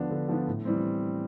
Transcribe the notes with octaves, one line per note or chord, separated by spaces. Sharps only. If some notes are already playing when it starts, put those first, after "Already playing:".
Already playing: D3 F3 B3 D4
D3
F3 B3 D4
A2
E3 G3 C4